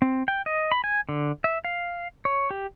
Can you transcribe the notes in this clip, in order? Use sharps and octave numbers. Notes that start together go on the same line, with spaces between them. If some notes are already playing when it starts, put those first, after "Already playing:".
C4
G5
D#5
B5
G#5
D3
E5
F5
C#5
G4